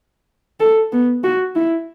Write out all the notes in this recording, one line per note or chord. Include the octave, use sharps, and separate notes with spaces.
A4
B3
F#4
E4